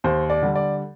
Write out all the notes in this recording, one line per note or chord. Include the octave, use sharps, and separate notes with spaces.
D#2 C5
D5
D3 G3
D5